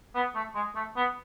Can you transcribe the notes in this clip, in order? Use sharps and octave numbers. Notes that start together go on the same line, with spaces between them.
B3
A3
G#3
A3
B3